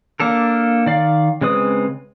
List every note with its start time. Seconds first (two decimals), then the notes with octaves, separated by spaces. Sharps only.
0.20 A#3 D4 A4 A#4
0.86 D#3 D5 F5
1.41 C#3 G#3 C4 B4 D#6